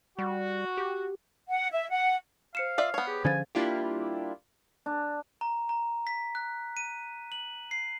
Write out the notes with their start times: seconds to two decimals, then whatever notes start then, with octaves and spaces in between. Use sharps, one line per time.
0.19 G3 F#4
0.77 G4
1.49 F#5
1.71 E5
1.90 F#5
2.55 C5 F5 C#7 E7
2.78 F4 D5 E5
2.94 B3 C#5
3.07 G4 G#4
3.24 D3 F3 C#4 C5 F5 G#5 A6
3.55 G3 A#3 D4 E4 F4 G4
4.86 D4
5.41 A#5
5.69 A#5
6.07 B6
6.35 F#6
6.77 D#7
7.32 F#7
7.71 C7